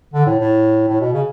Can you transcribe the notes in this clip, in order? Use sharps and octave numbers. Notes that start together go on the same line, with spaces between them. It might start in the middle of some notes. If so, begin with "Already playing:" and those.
D3
A2
A2
A2
B2
C#3